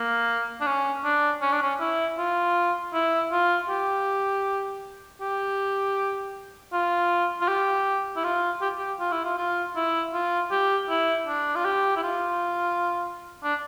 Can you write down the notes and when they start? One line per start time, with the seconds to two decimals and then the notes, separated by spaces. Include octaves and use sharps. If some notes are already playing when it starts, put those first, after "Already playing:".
Already playing: A#3
0.60 D4
0.66 C#4
1.04 D4
1.42 C#4
1.52 D4
1.62 C#4
1.80 E4
2.18 F4
2.93 E4
3.31 F4
3.69 G4
5.21 G4
6.72 F4
7.41 F4
7.48 G4
8.16 E4
8.24 F4
8.62 G4
8.77 G4
9.00 F4
9.12 E4
9.24 F4
9.37 F4
9.76 E4
10.13 F4
10.51 G4
10.89 E4
11.27 D4
11.56 F4
11.65 G4
11.96 E4
12.03 F4
13.43 D4